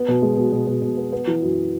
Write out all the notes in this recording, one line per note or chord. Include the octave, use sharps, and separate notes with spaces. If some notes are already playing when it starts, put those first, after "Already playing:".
Already playing: B3
B2
G#3
B2
B2
B2
B2
B3
B3
E3
F#2